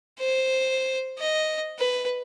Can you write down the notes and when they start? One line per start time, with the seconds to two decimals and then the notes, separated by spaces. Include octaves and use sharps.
0.19 C5
1.19 D#5
1.79 B4